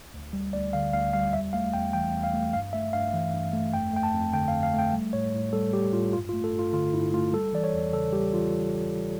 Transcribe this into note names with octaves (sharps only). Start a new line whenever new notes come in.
D2
G3
D2 D5
D3 F5
D2 F5
G3 F5
E2 E5
A3 F5
E2 G5
E3 G5
E2
F5
A3
G2 F5
A3 E5
G2 F5
E3
G2
A3
F2 G5
A3 G5
A5
F2
D3 G5
F5
F2
F5
A3 G5
G3
A2 C#5
A2
G3 A4
G3 G4
A2 F4
G2 F4
F4
A3
A4
G2
F4
D3 F4
G2 E4
A3 F4
G3 A4
E3 D5
C#5
E2
C#3 A4
G3 G4
E3 F4